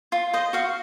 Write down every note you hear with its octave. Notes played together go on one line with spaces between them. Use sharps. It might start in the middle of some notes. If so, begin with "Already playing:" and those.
F4
C5 D#5
F#4 F5